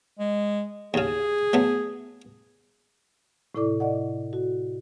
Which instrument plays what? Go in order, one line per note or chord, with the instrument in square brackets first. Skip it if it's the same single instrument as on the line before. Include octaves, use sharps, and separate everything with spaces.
[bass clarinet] G#3
[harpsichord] D#2 C#3 [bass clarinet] G#4
[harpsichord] F#3 A3 B3
[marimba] A2 C3 E4 A4 D5 D6
D5 D#5 F#5
F#4